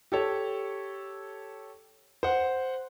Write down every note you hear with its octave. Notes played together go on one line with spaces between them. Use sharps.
G4 A4 C#5
C5 F#5